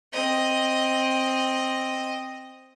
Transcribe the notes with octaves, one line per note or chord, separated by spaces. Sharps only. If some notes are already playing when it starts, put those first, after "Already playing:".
C4 D#5